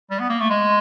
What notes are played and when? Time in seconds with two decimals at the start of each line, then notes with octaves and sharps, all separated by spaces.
0.11 G3
0.20 B3
0.30 A#3
0.40 A3
0.50 G#3